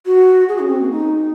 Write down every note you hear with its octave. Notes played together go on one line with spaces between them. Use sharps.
F#4
G#4
C#4
C4
A#3
D#4